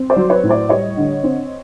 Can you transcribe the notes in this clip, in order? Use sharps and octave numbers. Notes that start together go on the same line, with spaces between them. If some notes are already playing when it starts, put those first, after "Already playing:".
Already playing: C4
C5 D5
F#3
B4 C#5
A2
C5 D5
G3 C#5 D#5
D3
C4